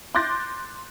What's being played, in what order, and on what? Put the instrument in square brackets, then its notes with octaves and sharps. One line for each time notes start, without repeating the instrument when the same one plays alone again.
[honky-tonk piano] C6 D6 F#6 G6 A6 A#6